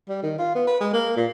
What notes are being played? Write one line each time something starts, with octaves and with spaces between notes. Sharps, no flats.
G3
D#3
F4
B3
B4
G#3
A#3
A#2